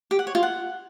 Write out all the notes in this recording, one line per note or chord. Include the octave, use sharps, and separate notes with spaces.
G4
F#5
C#5
F4
F#5